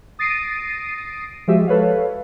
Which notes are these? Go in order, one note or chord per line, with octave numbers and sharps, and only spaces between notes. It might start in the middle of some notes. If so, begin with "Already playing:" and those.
D#6 A6 A#6 C7 D7 D#7
F3 G#3 F#4 G4 E5
A4 B4 C#5 F5